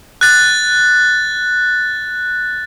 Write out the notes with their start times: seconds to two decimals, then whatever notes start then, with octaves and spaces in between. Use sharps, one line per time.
0.21 F#6 A6